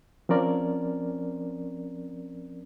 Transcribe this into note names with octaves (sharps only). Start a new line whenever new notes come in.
F3 C4 C#4 A#4 D5